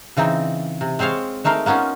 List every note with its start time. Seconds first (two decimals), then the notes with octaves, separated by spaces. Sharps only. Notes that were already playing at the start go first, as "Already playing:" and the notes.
0.17 C#3 E3 C4 D#4
0.81 C3
0.99 G#3 C4 C5 C#5 F5
1.44 G#3 A3 D#4 A#4 F5
1.66 A#3 B3 C#4 D#4 F4